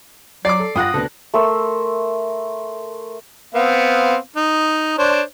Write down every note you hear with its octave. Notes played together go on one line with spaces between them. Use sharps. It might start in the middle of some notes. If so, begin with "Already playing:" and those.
F#3 D5 D6 C7
A4
G2 F4 F#5 G5 D#6 F#6 A#6
D2 B3 D4 A4
A3 A#4 C6 E6
B3 C4 F5
D#4
D4 C5 C#5